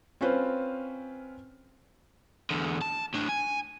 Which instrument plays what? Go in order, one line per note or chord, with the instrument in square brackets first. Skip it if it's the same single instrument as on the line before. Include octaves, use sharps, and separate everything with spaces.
[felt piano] C4 C#4 F4 B4 C5
[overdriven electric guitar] E2 D3
A5
A2 D4
G#5